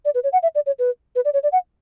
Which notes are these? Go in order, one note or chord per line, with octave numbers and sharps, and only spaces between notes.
D5
B4
C#5
F#5
E5
D5
C#5
B4
B4
D5
C#5
D5
F#5